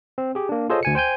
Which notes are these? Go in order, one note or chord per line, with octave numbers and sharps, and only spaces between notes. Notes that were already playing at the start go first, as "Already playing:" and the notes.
C4
G4 G#4
A#3 D4
F4 G#4 A4 C5 C#5 D#5
D2 G#5 C#7
C5 G5 G#5 G6